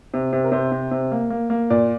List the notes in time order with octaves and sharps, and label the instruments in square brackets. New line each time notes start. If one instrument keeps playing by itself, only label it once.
[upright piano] C3
C3
A#4
C3 C5
C3
C3
A#3
A#3
A#3
A#2 D5